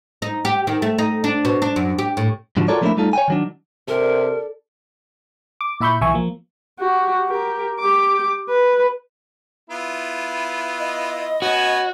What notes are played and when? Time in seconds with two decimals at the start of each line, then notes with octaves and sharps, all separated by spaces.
0.22 D#4
0.45 G4
0.67 D#3
0.82 A3
0.98 D#4
1.24 D4
1.45 B2
1.62 D4
1.76 F#2
1.99 G4
2.17 A2
2.57 G#2 D3 F3 F#3
2.68 F4 F#4 A4 A#4 C#5 D5
2.81 F3 A3 A#3 C4 D4 E4
2.97 G3 A3 D#4 F4 A4
3.13 C#5 G5 G#5
3.28 D#3 F#3 D4
3.88 C3 D4 A4 A#4
5.61 D6
5.80 A#2 E4 E5 B5 C#6 G6
6.01 B1 E3 E5 G#5 C#6
6.14 F3 A#3
6.79 F#4 G4
7.27 G4 A#4
7.80 G4 D6
8.49 B4
9.70 B3 E4 F4
10.79 D#5
11.42 B3 C#4 F#4 C#5